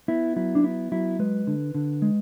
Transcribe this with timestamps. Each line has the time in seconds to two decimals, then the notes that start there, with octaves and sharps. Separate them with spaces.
0.08 B3 E4
0.36 F#3 E4
0.55 D4
0.64 B3 E4
0.92 F#3 E4
1.19 G#3 B4
1.47 D3
1.74 D3
2.02 G#3